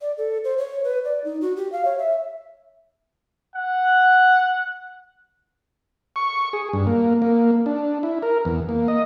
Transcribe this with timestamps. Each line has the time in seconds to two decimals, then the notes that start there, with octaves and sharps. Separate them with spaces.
0.01 D5
0.18 A4
0.44 C5
0.58 C#5
0.84 B4
1.04 D5
1.24 D#4
1.41 F#4
1.56 G4
1.72 F5
1.85 C#5
1.99 E5
3.55 F#5
6.16 C#6
6.53 G#4
6.73 G2
6.87 A#3
7.22 A#3
7.66 D4
8.03 E4
8.22 A#4
8.45 E2
8.69 A#3
8.88 D#5